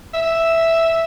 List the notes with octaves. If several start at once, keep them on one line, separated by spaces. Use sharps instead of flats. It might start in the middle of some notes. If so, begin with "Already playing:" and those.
E5